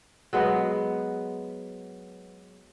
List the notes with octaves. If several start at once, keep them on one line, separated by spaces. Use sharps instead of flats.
F#3 G#3 B3